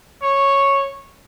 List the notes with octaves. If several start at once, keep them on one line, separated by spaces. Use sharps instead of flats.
C#5